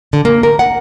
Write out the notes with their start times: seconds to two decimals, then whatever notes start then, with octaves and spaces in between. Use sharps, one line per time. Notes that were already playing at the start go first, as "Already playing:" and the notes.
0.13 D3
0.25 A#3
0.43 A#4
0.59 F#5